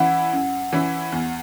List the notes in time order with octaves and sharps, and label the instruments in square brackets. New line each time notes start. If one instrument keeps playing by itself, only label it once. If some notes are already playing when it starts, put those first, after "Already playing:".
Already playing: [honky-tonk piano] E3 C#4 E4 [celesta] F#5
[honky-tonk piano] F#2
E3 C#4 E4
E2